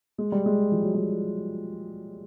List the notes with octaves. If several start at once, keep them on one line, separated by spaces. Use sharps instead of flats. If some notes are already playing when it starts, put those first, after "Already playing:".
G#3
G3
G#3
F3
F#3
G3